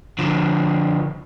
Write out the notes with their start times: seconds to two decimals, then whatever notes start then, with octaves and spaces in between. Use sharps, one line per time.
0.19 D3 F3